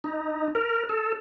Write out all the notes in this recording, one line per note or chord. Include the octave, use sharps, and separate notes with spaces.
D#4
A#4
A4